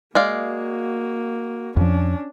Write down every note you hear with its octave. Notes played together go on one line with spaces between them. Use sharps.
G#3 A#3 F#4 D5 F5
F2 F3 C#4 D4